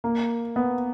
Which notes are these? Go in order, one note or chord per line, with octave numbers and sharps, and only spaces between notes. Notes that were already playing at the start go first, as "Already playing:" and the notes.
A#3
B3